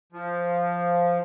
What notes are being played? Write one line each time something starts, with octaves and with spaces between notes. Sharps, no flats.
F3